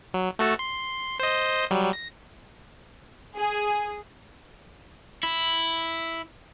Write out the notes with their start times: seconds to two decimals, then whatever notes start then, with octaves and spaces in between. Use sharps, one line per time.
0.14 F#3
0.39 A3 F#4 A4
0.59 C6
1.19 C5 D#5
1.71 F#3 G3
1.93 A#6
3.38 G#4
5.23 E4